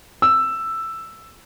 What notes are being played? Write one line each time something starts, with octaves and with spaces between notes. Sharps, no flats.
E6